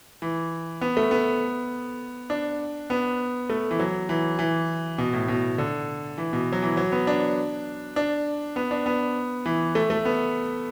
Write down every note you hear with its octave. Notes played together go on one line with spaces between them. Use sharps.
E3
B3
A3
B3
D4
B3
A3
E3
F#3
E3
E3
B2
A2
B2
D3
E3
B2
F#3
E3
F#3
B3
D4
D4
B3
D4
B3
E3
A3
A3
B3